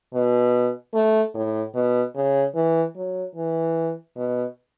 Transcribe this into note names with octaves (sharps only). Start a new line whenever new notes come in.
B2
A3
A2
B2
C#3
E3
F#3
E3
B2